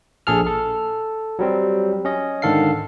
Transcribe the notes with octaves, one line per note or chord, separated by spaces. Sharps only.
A#1 G#4 A4 F6
A4
F#3 G3 C4
C#4 D#5
G#2 D3 D#3 A4 F5 C7